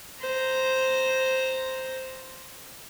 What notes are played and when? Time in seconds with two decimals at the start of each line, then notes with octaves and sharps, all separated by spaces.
0.20 C5 A#5